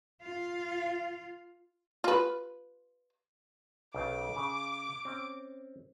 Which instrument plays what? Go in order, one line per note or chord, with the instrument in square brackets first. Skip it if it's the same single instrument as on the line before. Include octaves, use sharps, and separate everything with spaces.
[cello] F4 F5
[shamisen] F4 B4
[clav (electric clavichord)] B1 C#3 C5 [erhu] D6
[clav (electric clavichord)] C#3
C4 C#4